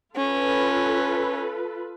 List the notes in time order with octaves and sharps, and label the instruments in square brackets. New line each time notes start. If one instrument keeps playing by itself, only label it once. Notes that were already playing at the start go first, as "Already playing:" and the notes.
[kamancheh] C#4 [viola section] F4 A4 B4